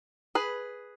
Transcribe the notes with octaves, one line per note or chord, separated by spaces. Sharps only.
G#4 B4